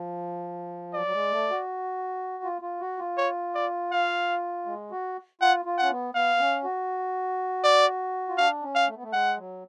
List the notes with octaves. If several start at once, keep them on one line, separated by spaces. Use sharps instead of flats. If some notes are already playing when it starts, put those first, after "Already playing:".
Already playing: F3
F#3 D5
F#3
G#3
A3
F#4
F4
F4
F#4
F4
C#5
D5
F5
G#3
F#4
F4 F#5
F4
C#4 F#5
B3
B3 F5
C#4
F#4
D5
F4
D4 F5
C#4
F5
A3
B3
A3
G#3 F#5
F#3